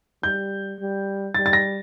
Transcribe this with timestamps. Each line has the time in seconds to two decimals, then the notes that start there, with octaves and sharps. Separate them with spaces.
0.23 G3 G6
0.79 G3
1.34 G3 A6
1.46 A6
1.53 A#6